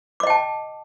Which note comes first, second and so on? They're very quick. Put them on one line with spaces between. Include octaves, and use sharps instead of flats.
D6 D#5 G5 A5